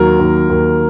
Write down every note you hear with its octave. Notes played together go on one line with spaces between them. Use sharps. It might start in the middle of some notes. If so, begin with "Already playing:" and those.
Already playing: D#2 F#3 A#4
D#2
D#2